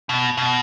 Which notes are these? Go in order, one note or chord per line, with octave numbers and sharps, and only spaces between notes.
B2
B2